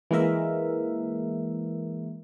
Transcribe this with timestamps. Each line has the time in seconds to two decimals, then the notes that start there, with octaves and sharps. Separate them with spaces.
0.11 E3 G#3 A#3 A#4 E5